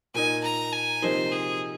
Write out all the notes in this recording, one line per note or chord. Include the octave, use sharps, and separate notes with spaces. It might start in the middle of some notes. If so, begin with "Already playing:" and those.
A#2 A#3 D#4 G#5
A#5
G#5
C3 F3 A#3 D#4 C5
G#4